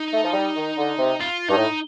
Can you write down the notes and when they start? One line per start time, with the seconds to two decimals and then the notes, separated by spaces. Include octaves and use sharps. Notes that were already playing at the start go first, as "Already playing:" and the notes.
Already playing: D#4
0.13 A3
0.24 F3
0.34 G3
0.56 D#3
0.77 D3
0.98 C3
1.21 F4
1.49 G2 D#4
1.57 A2